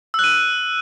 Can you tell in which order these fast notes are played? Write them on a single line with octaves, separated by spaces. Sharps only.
E6 F#6 D#7